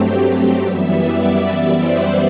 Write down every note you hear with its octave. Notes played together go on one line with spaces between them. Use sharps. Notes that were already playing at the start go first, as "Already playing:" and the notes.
Already playing: G2 F#3 A3 C4 G4
F#2 E3 G3 B3 E5
D5
C5